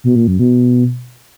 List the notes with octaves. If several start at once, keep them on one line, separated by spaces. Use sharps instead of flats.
B2
A#2
F#2
B2